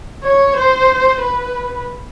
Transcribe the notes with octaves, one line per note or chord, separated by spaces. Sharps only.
C#5
C5
B4